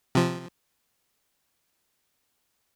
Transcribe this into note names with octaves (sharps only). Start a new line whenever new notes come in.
C3 F3